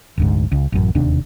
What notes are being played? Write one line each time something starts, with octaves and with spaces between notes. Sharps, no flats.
F1 D2 G#2
C#2
A1 F#2
E1 D#2 C3 D4